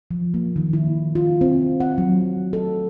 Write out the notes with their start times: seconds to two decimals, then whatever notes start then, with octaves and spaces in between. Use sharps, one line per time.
0.11 F3
0.34 A#3
0.56 D#3
0.73 E4
1.15 F4
1.41 C4
1.80 F#5
1.98 F#3
2.53 A4